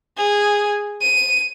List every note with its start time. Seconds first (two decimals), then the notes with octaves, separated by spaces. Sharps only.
0.17 G#4
1.01 D#7